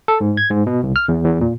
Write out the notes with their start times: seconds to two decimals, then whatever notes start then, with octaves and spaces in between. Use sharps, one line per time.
0.08 A4
0.21 G#2
0.37 G#6
0.50 G#2
0.67 B2
0.83 C2
0.96 F6
1.08 E2
1.24 E2
1.41 A#2